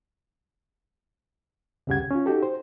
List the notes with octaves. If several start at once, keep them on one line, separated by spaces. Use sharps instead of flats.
D2 G2 C#3 G4 F#5 G#6
C2
C#4 F4
D#4 F#4 G4 A4
C5